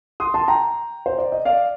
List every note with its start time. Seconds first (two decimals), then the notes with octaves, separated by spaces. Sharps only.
0.20 C6 D#6
0.34 A5 C6
0.48 G5 A#5
1.06 C5
1.18 D5
1.32 D#5
1.45 D5 F5